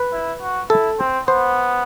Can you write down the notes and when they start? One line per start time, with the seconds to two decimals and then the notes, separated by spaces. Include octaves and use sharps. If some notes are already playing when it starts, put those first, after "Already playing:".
Already playing: B4
0.12 E4
0.41 F#4
0.70 E4 A4
0.99 C4
1.27 B3 C5